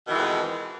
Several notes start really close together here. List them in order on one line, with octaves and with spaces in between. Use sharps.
B2 D#3 E3 G#3 F2